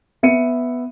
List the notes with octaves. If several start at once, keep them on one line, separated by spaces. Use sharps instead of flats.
B3 E5 C#7 D#7